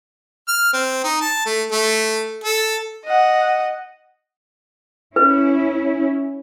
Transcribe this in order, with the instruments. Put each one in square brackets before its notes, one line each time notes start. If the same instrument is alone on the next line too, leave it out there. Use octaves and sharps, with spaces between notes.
[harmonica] F6
C4
D#4
A5
A3
A3
A4
[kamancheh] D#5 F#5
[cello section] C#4 E4 [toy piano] B4